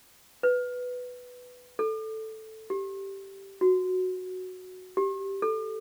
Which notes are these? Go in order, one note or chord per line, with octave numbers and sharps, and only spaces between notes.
B4
A4
G4
F#4
G4
A4